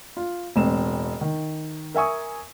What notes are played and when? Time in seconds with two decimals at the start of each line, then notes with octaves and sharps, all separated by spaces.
0.17 F4
0.56 E1 A1 C4 E7
1.21 D#3
1.94 A#4 E5 G#5 C#6 D#6